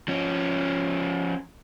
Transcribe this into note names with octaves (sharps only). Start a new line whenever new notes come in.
F3 C#4